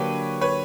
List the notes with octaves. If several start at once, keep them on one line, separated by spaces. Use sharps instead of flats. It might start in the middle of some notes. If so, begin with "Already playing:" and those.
Already playing: D3 F#3 A#3 D4 G4 B4 C#5
B4 C#5